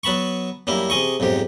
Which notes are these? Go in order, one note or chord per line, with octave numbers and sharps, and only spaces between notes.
F#3 B3 A5 B5 C#6
F#2 G3 A#3 E4
C3 G#4 D#5 C#6
B1 F2 G#2 G4